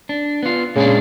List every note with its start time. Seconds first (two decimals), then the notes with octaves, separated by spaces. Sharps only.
0.09 D4
0.43 B3 F4
0.76 A#2 C#3 G#3 D4